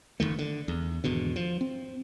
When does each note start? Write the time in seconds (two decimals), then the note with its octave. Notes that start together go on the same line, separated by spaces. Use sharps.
0.20 F#1 E2 D#3 A3
0.39 D3
0.68 E2
1.04 G#1 E2 B2 D3
1.36 F3
1.61 C4